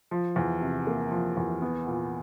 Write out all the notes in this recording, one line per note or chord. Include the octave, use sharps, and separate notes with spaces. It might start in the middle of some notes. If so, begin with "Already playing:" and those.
F3
E2
C3
A#3
F3
E2
B3
A#2